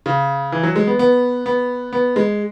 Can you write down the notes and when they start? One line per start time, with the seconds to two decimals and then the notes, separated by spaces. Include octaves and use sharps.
0.06 C#3
0.52 E3
0.63 F#3
0.76 G#3
0.87 B3
0.99 B3
1.46 B3
1.93 B3
2.16 G#3